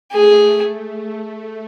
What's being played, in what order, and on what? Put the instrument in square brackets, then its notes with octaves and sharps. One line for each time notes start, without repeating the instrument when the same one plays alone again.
[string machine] A3 [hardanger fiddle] G#4